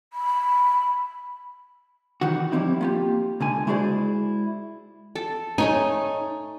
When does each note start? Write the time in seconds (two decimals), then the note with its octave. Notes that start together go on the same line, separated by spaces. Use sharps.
0.13 B5
2.21 D#3 E3 F#4
2.52 F3 G3 G#3 C4 D#4 E4
2.81 A#3 F4 G4
3.40 C#2 D3 G#5
3.67 G#3 E4 F#4 G#4 C5 D5
5.15 A4
5.58 A3 D#4 C#5 G#5